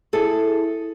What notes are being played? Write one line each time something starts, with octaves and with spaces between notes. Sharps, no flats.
E4 G#4 A4